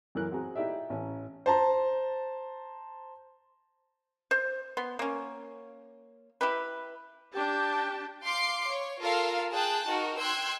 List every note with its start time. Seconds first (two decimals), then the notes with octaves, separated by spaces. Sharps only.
0.15 F#2 E3 C#4 A#4 F#6
0.31 C4 F#4 G#4 A#5
0.55 D#4 E4 G4 D5 E5
0.90 A1 C#4
1.46 C5 A5 A#5
4.31 C5
4.77 B3 C6
4.99 A#3 C#4
6.41 E4 G4 B4
7.33 D4 G4 G5 A5
8.23 F5 C6 D6 C7 D7
8.68 C#5
9.00 F4 A4 A#4 F5
9.51 G#4 G5 A5 F#6
9.87 D#4 F#4 A#4
10.20 G5 C6 E6 F#6 G#6